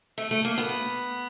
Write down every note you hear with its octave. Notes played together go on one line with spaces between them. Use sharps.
A3
A3
A#3
B3